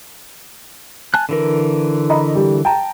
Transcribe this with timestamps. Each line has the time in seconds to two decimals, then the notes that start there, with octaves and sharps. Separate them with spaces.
1.14 G#5 A5 F#6
1.29 D3 E3 A#4
2.10 D#5 A#5 B5
2.35 G3
2.65 G5 A5 A#5